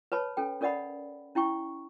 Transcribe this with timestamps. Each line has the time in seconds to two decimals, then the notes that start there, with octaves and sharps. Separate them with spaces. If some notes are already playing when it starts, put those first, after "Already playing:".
0.12 B4 C#5 A5 B5
0.37 C#4 A4 G5
0.61 C#4 A#4 D5 D#5 F#5 B5
1.35 C#4 E4 G5 C#6